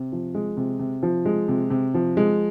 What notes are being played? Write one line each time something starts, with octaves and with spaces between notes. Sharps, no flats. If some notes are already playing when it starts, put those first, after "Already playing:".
Already playing: C3
F3
G#3
C3
C3
F3
G#3
C3
C3
F3
G#3